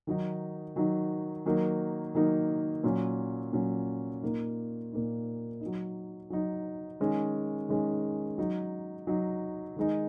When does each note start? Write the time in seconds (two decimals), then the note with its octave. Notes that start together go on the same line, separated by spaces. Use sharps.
0.07 D#3 F#3 D#4
0.76 D#3 F#3 D#4
1.46 D#3 F#3 A#3 D#4
2.15 D#3 F#3 A#3 D#4
2.84 A#2 F#3 C#4
3.53 A#2 F#3 C#4
4.22 A#2 A#3 D#4
4.92 A#2 A#3 D#4
5.61 D#4
5.66 F#3
6.30 F#3 D#4
7.00 D#3 G#3 C#4
7.69 D#3 G#3 C#4
8.38 F#3 D#4
9.07 F#3 D#4
9.76 D#3 G#3 D#4